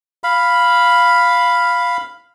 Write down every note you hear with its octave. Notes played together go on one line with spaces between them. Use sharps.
F5 B5